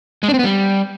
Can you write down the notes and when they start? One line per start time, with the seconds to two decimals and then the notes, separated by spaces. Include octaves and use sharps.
0.23 G#3
0.28 D4
0.34 C4
0.39 B3
0.44 G3